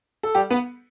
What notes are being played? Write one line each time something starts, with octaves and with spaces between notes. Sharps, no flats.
A4
G3 G4
B3 B4